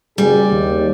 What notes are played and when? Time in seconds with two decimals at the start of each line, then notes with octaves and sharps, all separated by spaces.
0.18 F#1 G3 G#4
0.51 D#2